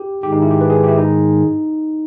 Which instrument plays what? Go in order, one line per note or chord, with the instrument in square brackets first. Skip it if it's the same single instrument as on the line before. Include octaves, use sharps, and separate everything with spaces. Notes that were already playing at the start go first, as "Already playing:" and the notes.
Already playing: [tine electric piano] G4
[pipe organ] G#2 D#3 G#3 [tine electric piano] G4
[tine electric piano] D#4
E4
G4
B4
G#4
G4
E4
D#4